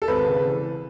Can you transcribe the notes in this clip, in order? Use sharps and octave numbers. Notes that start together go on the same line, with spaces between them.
A4
G#1 B4
C#3
E3